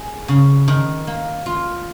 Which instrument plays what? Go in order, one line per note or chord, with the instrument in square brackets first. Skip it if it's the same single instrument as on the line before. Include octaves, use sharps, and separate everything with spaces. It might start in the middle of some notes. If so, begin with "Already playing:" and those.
Already playing: [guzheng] G#4
C#3
D#3
A#3
F4